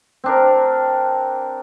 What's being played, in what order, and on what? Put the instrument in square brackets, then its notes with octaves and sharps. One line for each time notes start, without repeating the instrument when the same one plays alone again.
[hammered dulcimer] C4 D4 A#4